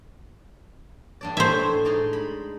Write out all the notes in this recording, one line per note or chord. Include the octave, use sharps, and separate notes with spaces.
G2 D4 D5
A2 C5 E5 G#5
G#3 D#4 D5
B5